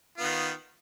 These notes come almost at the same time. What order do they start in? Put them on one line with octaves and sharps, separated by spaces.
F4 B3 D#3